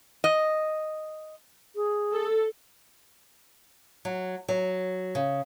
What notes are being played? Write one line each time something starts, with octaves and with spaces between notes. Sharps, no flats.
D#5
G#4
A4
F#3
F#3
C#3